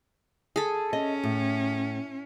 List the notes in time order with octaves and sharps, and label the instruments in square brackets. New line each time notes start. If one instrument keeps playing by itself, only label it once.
[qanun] G#4 A4
[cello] C#4 [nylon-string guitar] D#5
[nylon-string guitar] A2